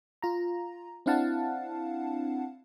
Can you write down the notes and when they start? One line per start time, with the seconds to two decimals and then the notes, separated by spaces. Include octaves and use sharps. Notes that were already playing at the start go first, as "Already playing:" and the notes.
0.22 F4 A#5
1.06 C4 D4 E4 F5 F#5 A5